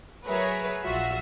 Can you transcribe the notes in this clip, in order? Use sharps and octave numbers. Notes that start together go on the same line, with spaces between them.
F#3 G#4 A#4 B4 C#5 E5
A#1 F#3 F4 F#4 E5